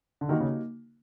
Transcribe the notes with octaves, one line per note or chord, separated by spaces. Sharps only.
D3
D#3 G3 A#3 D#4 F#4
C#3